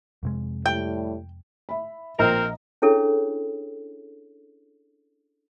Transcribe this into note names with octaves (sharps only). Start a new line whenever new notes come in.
F2 C3 G#3
A2 G3 G5
E5 B5
A#1 C4 A#4 D#5 A#5
C#4 D4 E4 G#4 A4 C#5